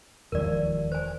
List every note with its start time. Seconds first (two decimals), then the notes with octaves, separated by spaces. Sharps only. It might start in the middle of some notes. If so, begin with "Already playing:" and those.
0.32 E1 D#2 F3 A#4 D5
0.92 C5 G#5